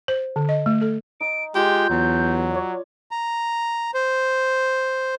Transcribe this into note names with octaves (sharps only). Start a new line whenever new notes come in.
C5
D3
D#5
A3
A4
D#4 D7
G#3 F4 G4 G6
E2 F#3
C#5 D5
A#5
C5